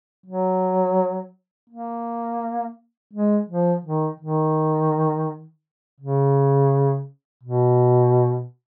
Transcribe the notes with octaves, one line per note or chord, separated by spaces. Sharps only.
F#3
A#3
G#3
F3
D#3
D#3
C#3
B2